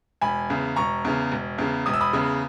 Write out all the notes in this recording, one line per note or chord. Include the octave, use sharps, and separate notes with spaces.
E1 G#5 B5
E2 C#3
E1 A#5 C#6
E2 C#3
E1
E2 C#3
E1 D#6
E6
B5 D#6
E2 C#3